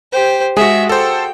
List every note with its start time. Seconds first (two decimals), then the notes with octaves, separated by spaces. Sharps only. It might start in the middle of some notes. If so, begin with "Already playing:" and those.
0.12 G4 C5
0.57 G#3 F#4 G#4 E5
0.89 A4 C5 G5